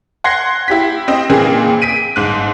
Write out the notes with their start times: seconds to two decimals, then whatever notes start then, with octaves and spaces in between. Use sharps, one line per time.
0.24 F#5 C6 G#6 A#6 C7
0.68 E4 G4 B6
1.08 C4 D#5
1.30 A#2 E3 A#3 C4 G#4
1.82 B6 D7 D#7
2.16 G1 G#2 F#6